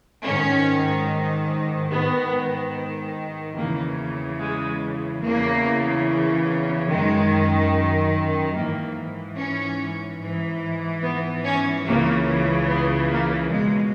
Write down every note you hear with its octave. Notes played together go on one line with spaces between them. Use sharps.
G#2 D#3 C#4
G#2 D#3 B3
E2 C#3 E3 A#3
G#3
E2 C#3 E3 A#3
F#2 D#3 G#3
G#2 E3 A#3
C#4
G#2 E3
B3
C#4
C#2 C#3 E3 A#3
B3
A#3
C#2 B2 G#3